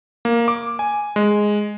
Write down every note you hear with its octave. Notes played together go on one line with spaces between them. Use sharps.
A#3
D6
G#5
G#3